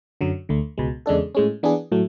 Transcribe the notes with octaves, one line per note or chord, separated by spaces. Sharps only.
F#2 D3 F#3
D2 D3 A3
C#2 B2 G#3
E2 C#3 G#3 D4 A4
A2 G#3 C#4
E3 B3 D4 G#4
A2 F#3 A3